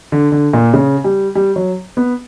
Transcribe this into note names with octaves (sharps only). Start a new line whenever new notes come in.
D3
D3
A#2
C#3
G3
G3
F#3
B3